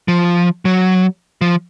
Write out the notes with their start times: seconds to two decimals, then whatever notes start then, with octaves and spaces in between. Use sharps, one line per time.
0.08 F3
0.65 F#3
1.41 F3